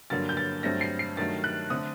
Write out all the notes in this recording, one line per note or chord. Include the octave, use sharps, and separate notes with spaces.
G2 D3 F#3 A#3 A6
G6
A6
G2 F#3 A3 C4 A#6
C7
C7
G2 D#3 F#3 A3 A6
F#6
D3 A3 C4 D#6